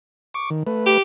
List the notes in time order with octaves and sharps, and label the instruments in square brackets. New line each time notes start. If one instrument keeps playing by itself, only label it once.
[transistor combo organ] C#6 D6
D#3
A3 B4
[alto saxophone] G4